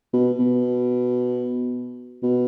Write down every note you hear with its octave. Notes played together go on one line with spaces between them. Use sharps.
B2
B2
B2